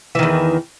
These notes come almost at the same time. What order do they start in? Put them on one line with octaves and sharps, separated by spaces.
E3 D#3 E2